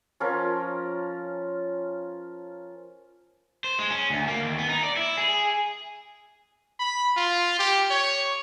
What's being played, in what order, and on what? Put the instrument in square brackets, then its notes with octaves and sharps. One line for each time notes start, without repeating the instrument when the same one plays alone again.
[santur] F3 C#4 F4 A#4
[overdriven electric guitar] C5
G#3
C#4
D2
A#3
D#2
B3
D#4
D5
E4
G#4
[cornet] B5
F4
G4
C#5